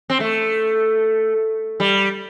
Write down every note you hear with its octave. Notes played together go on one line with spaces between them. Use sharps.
C4
A3
G3